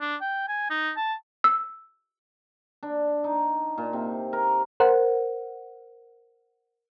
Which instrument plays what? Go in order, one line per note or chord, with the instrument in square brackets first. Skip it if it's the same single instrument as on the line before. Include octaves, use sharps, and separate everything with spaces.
[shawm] D4
G5
G#5
D#4
A5
[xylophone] E6
[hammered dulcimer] D4
D#4
A#2
C3
A#4
[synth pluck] A#4 C5 F#5